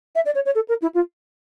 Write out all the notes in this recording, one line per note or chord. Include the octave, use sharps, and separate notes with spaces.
E5
D5
C#5
C#5
A4
A#4
E4
F4